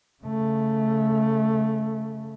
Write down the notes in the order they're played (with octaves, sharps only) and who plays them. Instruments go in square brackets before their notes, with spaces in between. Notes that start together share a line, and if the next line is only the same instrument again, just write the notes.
[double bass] C#3 A3